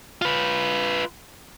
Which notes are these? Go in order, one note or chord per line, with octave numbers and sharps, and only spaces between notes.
F4 B4